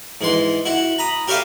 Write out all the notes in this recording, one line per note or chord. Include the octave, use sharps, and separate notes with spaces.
G#2 E3 C6
E4 F#4
A#5 B5 D#6
G4 A#4 C#5 E5 F5 G#5